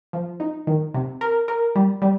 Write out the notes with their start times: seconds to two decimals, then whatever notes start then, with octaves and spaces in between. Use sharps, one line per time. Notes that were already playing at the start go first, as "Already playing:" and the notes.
0.13 F3
0.40 D#4
0.67 D#3
0.94 C3
1.21 A#4
1.48 A#4
1.75 G3
2.02 G3